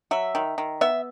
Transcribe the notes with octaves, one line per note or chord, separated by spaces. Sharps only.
F#3 E5
D#3
D#3
B3 E5